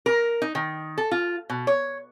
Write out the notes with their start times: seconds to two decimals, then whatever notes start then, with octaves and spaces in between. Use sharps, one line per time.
0.06 A#4
0.42 D#4
0.55 D#3
0.98 A4
1.11 F4
1.50 B2
1.67 C#5